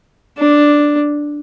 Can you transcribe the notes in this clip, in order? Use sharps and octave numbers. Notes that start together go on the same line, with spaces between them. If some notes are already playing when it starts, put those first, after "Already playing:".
D4